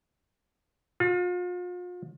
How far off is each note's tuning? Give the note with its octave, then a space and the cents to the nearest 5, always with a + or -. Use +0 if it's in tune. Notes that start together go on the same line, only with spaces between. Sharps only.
F4 +40